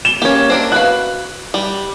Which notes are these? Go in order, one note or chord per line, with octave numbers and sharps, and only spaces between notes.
E7 G7
A#3 C#4 G4 C#5
C4 D4 A#4
F#4 B4 F5 F#6
G3